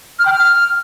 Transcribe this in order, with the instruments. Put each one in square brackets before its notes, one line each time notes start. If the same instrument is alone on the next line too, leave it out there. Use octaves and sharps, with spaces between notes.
[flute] F6
G5
F6